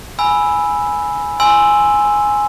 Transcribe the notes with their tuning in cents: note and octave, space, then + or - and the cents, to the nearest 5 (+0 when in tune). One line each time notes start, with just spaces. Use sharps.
G#5 +0 B5 +0 E6 +0
G#5 +0 C6 +0 E6 +0